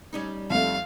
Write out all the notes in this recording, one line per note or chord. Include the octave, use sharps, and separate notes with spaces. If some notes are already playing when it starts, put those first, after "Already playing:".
G3 C#4 D#4
F2 A3 F5